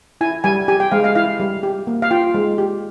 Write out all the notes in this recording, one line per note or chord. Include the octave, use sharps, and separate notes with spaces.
E4 G#5
G3 G#5
G4 G#5
G5
G#3 F5
F5
E4 F5
G3
G4
A#3
F5
F4 G5
G#3
G4